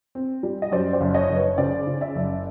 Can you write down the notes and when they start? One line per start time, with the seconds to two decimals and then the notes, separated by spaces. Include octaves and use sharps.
0.15 C4
0.43 G3
0.62 D#5
0.72 F#2 C5 D5
0.93 C5 D5
1.01 F#1
1.14 C#5 D#5
1.30 F#1
1.36 B4 C#5
1.58 C#3 C5 D5
1.87 C#3
2.01 D5 E5
2.15 F#1